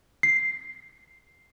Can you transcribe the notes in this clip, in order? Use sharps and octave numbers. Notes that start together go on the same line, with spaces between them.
C7